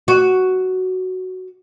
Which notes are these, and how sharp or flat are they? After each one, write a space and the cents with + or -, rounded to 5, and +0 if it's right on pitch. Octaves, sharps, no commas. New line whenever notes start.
F#4 +5